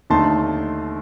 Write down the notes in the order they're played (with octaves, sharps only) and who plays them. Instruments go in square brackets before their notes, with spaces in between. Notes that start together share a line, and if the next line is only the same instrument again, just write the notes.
[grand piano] D#2 D3 A3 D#4 A5 C6